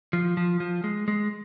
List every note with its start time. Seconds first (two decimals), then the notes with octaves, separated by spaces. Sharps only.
0.13 F3
0.37 F3
0.60 F3
0.84 G#3
1.08 G#3